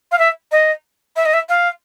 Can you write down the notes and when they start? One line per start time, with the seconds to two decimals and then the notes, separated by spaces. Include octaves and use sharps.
0.11 F5
0.19 E5
0.52 D#5
1.16 E5
1.25 D#5
1.33 E5
1.49 F5